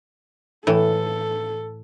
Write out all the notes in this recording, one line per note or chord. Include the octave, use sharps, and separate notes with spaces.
A2 E3 A4